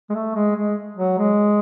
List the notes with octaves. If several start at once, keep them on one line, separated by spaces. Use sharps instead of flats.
G#3
A3
G#3
G#3
F#3
G#3